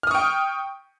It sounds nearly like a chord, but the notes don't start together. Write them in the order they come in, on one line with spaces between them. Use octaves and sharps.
F6 D#6 C#6 G5